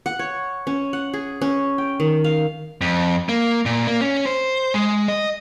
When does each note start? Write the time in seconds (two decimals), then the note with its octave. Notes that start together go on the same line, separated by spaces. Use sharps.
0.06 F#5
0.19 C#5
0.67 C#4
0.93 F#5
1.13 G#4
1.41 C#4
1.78 G5
2.00 D#3
2.24 F5
2.81 F2
3.29 A#3
3.66 A#2
3.87 A#3
4.01 C#4
4.26 C5
4.74 G#3
5.08 D#5